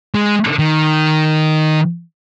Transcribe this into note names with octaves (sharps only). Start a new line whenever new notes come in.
G#3
D#3